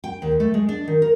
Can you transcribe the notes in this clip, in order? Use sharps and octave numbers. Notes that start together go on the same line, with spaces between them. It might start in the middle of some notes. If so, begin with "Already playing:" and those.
G5
D#2
A3
G#3
D4
D#3
A#4